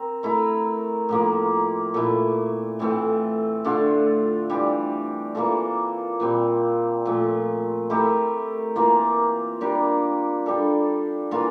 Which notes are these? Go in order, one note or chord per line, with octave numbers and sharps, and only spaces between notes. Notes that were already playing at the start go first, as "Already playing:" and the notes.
Already playing: C4 A#4
A3 E4 A#4
A2 F3 A#3
A#2 A3 E4
A2 E3 A3 C4
D3 A3 D4 F4
E3 G3 D4 G4
E3 A#3 F4 A4
A#2 G3 C4
A#2 F3 A3
A3 E4 G4 A#4
E3 A#3 F4 A#4
G3 D4 G4 A#4
G3 D4 A4
E3 A#3 F4 A#4